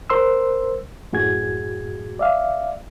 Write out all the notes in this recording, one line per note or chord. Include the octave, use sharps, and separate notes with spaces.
A#4 C5 C6 E6
F#2 A2 F#4 G#4 G#6
D5 E5 F5